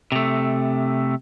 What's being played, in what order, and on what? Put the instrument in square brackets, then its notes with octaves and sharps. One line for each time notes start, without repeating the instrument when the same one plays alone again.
[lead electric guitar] C3 A3